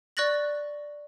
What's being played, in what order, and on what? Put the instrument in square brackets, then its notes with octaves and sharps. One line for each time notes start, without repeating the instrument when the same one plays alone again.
[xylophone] D5 C#6 F#6 A6 A#6 F#7